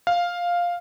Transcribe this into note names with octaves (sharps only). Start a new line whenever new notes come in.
F5